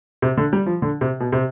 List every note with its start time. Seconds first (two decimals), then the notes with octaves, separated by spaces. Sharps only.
0.22 C3
0.37 D3
0.53 G3
0.66 F3
0.82 D3
1.01 C3
1.20 B2
1.32 C3